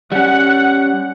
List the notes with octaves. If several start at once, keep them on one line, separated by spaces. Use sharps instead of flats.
G3 C#4 F#5